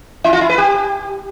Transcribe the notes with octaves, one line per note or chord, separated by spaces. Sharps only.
E4
F4
E4
B4
G4